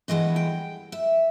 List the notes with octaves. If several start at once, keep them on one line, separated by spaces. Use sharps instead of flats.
G2 E3 G#3 B3 D#5
G5
E5